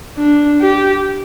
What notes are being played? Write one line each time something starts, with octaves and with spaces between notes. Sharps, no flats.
D4
G4